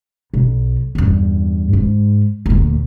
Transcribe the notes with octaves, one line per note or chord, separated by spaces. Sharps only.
B1
E2 G2
G#2
D2 A#2